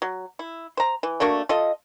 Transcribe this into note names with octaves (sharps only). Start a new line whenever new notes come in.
F#3
E4
C5 A#5
E3
A3 A#3 D4 F#4
F4 A4 D#5